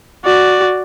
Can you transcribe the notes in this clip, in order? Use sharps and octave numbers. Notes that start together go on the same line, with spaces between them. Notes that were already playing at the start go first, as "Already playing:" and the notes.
F#4 D5